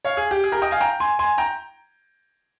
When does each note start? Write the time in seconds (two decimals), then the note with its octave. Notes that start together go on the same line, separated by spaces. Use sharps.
0.05 C#5 F5
0.17 G#4
0.31 G4
0.44 G#4
0.52 G4 A#4
0.62 D#5 G5
0.71 F5 G#5
0.80 G5 A#5
1.00 G#5 C6
1.19 G#5 C6
1.38 G5 A#5